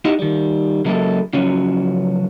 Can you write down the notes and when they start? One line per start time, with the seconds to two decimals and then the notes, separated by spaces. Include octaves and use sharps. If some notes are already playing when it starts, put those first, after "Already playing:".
0.05 D#4 E4 G4 D#5 F#5
0.19 D#3 G3
0.85 C#3 F#3 G#3 A#3 E4 A4
1.33 C#3 F3 F#3 C#4 F#4